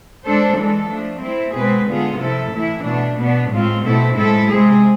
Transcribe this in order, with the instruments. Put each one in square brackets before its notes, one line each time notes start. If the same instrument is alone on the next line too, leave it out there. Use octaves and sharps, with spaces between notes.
[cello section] G#3 D4 A4 C5
E3 G#3 D4 A4
F3 A3 D4
A3 C4 E4
B2 G#3 C4 G#4 B4
D3 G#3 B3 F4 G#4
C3 F3 A3 E4 A4
A2 E3 A3 E4
B2 A3 D4
B2 B3 D4
A2 G#3 C4 F4
B2 A3 C4 E4 A4
A2 G#3 C4 E4 A4
C3 G#3 C4 G#4